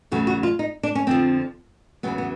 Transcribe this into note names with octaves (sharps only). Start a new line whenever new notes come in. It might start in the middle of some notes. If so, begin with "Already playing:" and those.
E2 C#3 F#3 A3 F#4
F#4
F4
D#4
D4
C#4
F2 D3 F3 C4
E2 C#3 F#3 B3
B3